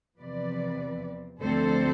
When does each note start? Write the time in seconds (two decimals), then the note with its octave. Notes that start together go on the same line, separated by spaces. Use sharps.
0.20 E2 C3 F3 C4 B4 D5
1.42 D2 D3 F3 C4 A4 C5